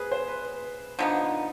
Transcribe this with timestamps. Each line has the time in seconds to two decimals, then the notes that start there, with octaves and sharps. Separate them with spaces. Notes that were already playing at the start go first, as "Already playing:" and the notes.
Already playing: G#4 B4 C5
0.11 C5
0.28 B4
0.99 D3 F3 B3 D#4